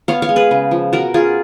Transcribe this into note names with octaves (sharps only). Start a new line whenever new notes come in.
B3 C#5 F5
C#5 F5
G#3
G#4 B4
C#3
F3
B2 F#4 A#4
C#4 F4 G#4